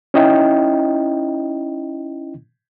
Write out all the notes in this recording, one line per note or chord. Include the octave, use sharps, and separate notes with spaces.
C#4 D#4 E4 D#5 G5